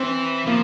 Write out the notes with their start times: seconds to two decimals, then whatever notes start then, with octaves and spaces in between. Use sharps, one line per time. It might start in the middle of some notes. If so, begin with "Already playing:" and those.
Already playing: E3 C4
0.47 F3 A#3